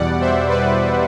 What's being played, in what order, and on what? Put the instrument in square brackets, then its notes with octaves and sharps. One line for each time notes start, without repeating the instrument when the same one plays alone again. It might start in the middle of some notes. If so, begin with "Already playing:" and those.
Already playing: [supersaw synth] E2 B2 G3 D5 F#5
C5 E5
B4 D5